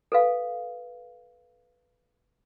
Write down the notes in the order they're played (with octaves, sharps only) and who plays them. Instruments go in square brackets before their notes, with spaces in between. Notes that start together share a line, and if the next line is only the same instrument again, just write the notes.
[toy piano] A4 B4 F5